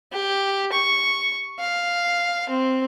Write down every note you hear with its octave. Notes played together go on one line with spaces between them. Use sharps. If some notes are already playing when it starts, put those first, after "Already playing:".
G4
C#6
F5
C4